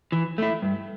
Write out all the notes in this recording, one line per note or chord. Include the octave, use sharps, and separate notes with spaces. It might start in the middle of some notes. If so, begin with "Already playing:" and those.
E3
A3 E4
G2